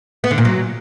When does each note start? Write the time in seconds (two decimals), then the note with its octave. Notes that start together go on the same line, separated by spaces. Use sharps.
0.24 B3
0.31 D3
0.38 A#2
0.45 F#3